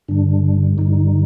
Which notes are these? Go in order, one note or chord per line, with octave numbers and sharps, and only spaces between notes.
G2 D3 G3 D4
G2 D3 G3 D#4